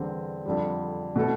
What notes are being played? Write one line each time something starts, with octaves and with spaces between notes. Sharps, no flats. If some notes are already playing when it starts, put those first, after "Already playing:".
Already playing: E2 D3 G3 C4
F2 D3 G3
B2 A3 E4 A4